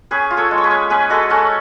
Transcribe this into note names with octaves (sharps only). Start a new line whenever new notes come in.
C#4 G#4 B4
F4
A4 C#5
G#3
C#5
G#4 B4
C#4
C#4 G#4 B4
G#3 F#4 A4
C#4 F#4 A4